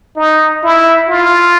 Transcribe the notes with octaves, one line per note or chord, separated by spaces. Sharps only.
D#4
E4
F4